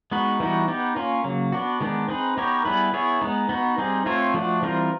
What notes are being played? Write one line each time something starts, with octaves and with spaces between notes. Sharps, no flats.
G#3 B3 D#4 F#4 B4
E3 G3 B3 D#4 F#4
B3 D#4 G4
A#3 C#4 F4
C#3 F#3 A#3
B3 D4 F#4
D#3 G#3 B3 D4
C4 D#4 G#4 B4
B3 D#4 G4 A#4 C#5
G3 B3 E4 G#4 B4
B3 E4 G#4 C#5
G#3 B3 D#4
B3 D#4 F#4
G3 C4 D#4 G#4
A3 C4 F4 A4 C#5
F3 A3 D4 F#4
E3 G3 C4 F4 A#4